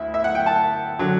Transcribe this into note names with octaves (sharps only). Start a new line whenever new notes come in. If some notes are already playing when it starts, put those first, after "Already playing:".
Already playing: D2 E4 E5
E5
F#5
G5
A5
D3 F#3